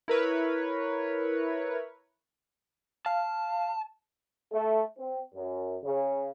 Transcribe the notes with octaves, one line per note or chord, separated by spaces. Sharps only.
E4 A#4 B4 C#5
F5 A5
A3
C4
F#2
C#3